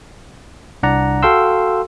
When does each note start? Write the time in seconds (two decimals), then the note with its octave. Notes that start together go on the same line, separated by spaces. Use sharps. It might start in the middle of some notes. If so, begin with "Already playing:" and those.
0.83 C2 D4 D5 F#5 A#5
1.23 F#4 A4 F5 G5 C6 E6